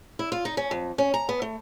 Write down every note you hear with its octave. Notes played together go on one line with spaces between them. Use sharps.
E4
F4
D#4
C#4
F2
C#4
A#5
B3
A3